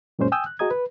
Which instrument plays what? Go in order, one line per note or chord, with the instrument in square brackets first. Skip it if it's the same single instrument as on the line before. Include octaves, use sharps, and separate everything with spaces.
[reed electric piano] F#2 A#2 G#3 C#4 C5
G5 G#5 D#6 E6 G6
F#6
F#4 G#4 D#5 A#5 D#6 G#6
B4